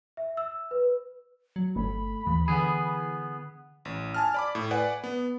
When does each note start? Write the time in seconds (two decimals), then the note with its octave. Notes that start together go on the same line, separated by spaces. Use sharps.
0.17 E5
0.37 E6
0.71 B4
1.56 F#3
1.76 G1 A3 B5
2.27 D#2 E3
2.48 D3 B3 G#4
3.85 A1
4.14 G#5 A5 F6
4.34 D5 B5 D6
4.55 A2
4.71 B4 D5 F#5 G#5
5.04 B3